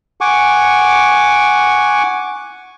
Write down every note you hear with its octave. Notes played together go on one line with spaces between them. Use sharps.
F#5 G#5 C#6 D6